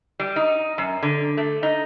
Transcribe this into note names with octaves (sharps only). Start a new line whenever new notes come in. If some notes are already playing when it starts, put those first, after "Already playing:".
G3
D#4
F#2
D3
A3
D#4